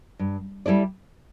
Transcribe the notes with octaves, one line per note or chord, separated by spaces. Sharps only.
G2
G3 E4 A4 D5